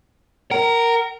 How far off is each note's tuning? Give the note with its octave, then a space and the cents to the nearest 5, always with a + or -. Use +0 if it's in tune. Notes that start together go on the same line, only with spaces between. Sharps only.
A#4 -5 F#5 +45